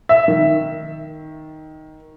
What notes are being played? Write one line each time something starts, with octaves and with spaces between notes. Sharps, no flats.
E5
D#3